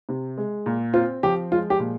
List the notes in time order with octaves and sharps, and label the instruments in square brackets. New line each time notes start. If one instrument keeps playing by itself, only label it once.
[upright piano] C3
G#3
A#2
[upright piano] C4 [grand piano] F4
[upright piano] F3 [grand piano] G4
[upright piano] G#3 [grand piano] F4
[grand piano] G4
[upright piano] A#2